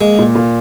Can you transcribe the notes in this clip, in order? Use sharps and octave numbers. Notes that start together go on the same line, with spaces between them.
G#3 A#3
A#2
A#2